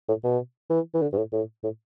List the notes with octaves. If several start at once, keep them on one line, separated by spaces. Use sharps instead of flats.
A2
B2
E3
E3
D3
G2
A2
A2
A2